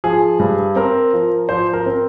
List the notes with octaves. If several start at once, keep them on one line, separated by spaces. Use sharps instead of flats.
F3 G#4
G2
C4 A#4
F3
F3 C5
A#4
C4